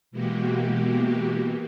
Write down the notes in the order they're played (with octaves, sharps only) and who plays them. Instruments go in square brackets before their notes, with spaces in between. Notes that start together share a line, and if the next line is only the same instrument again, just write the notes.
[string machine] B2 E3 G#3 A#3 F#4 G4